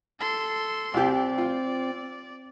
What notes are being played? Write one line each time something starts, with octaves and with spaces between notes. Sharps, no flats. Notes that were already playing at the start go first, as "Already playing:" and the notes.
A4 C6
C2 C4 G4 D5
F4